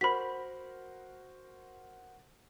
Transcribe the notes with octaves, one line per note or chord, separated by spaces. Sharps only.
F#4 A#4 C5 B5 B6